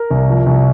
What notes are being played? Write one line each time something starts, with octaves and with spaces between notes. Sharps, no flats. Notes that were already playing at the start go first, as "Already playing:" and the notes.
Already playing: A#4
C2
F3
C2